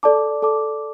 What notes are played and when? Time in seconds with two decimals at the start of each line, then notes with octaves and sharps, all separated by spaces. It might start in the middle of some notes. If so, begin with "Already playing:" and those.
0.03 A4 D5 A5 D6
0.42 A4 D5 A5 D6